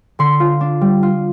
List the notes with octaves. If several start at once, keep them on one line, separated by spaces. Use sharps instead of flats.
D3 C6
F4
D4
G3
F4